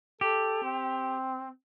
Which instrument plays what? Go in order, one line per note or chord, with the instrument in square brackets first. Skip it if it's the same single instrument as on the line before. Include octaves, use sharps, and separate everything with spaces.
[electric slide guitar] G4 [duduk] A4
[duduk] C4